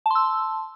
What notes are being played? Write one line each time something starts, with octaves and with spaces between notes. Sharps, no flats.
A5 C6 E6